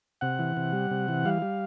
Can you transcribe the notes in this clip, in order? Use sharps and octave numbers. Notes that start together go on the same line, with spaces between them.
C3 F#5
E3
C3
G3
C3
E3
G3 F5
G3